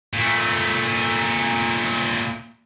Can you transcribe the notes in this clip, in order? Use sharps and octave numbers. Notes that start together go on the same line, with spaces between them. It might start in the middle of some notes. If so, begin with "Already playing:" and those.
A#2 A3